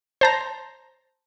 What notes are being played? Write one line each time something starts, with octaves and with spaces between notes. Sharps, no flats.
C5 A5 A#5